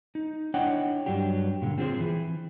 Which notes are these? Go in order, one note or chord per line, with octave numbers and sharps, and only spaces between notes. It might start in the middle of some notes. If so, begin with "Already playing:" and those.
D#4
D4 E4 C#5 D#5 F#5 G5
G2 F#3 D4 G4
A#2 D3
C4 F4 G#4 C5
E3